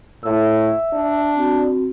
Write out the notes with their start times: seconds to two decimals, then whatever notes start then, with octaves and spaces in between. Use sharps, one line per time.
0.23 A2 E5 E6
0.93 D4
1.36 C4 F#4